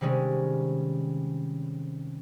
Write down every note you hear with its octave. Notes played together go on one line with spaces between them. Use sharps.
C3 D#3 G3 G#3 C#4